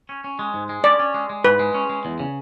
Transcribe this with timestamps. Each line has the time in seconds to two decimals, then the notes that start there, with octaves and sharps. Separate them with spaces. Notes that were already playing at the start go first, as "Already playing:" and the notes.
0.09 C#4
0.24 C#4
0.39 G#3
0.54 G#2
0.69 G#3
0.84 C#4 D5
0.99 C#4
1.14 G#3
1.29 G#3
1.45 G#2 B4
1.59 G#3
1.74 C#4
1.89 G#3
2.05 E2
2.20 C#3